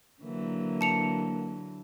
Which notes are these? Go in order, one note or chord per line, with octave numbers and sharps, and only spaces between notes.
D3 E3 F#3 A#3
A5 C#7 F7